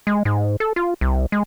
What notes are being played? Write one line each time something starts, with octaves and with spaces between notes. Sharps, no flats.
G#3
G#2
A4
F4
C2
G#3